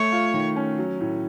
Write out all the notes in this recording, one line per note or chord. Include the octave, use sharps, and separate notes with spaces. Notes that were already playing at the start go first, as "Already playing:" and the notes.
Already playing: A3 C#5
F4
D#3
C#4
F#3
A2